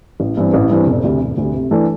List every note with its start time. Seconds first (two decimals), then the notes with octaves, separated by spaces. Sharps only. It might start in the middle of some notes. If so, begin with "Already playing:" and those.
0.20 A1
0.37 G2 E3 C4
0.54 A1
0.70 G2 E3 C4
0.87 E1
1.04 D2 C3
1.21 E1
1.37 D2 C3
1.54 C3
1.71 E3 A3 D4 A4